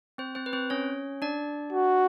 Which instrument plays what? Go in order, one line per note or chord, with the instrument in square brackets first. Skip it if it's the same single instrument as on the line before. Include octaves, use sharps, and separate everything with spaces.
[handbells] C4 C5
C4 C5
B4
C4 C5
C#4 C#5
D4 D5
[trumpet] F#4